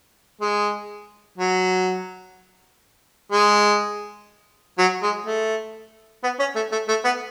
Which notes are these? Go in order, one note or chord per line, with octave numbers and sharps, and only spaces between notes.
G#3
F#3
G#3
F#3
G#3
A3
B3
C#4
A3
A3
A3
B3